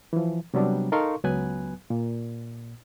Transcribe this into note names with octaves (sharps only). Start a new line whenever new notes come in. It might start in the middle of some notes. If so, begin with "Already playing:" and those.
E3 F3
C3 F#3 G3 B3 D4
D#4 A4 A#4 F5 C6 C#6
C#2 F#3 B3 B4 G#5 F#6
A#2